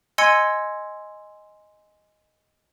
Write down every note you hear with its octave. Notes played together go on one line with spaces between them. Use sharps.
D#5 G#5 C6 E6 G#6 C#7